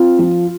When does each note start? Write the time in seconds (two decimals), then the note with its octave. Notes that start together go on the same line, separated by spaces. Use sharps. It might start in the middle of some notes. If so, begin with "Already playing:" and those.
Already playing: C4 F4
0.19 F3